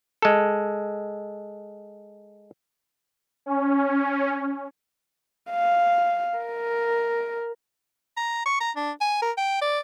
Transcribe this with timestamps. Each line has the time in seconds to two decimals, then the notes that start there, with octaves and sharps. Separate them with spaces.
0.22 G#3 A4
3.46 C#4
5.51 F5
6.38 A#4
8.17 A#5
8.46 C#6
8.60 A#5
8.76 D4
9.01 G#5
9.22 A#4
9.37 G5
9.62 D5